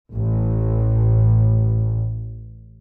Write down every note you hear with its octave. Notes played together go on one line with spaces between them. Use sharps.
A1 A2